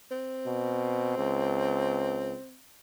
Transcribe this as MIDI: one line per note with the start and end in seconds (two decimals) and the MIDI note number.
0.11 2.59 60
0.46 1.15 47
1.18 2.36 37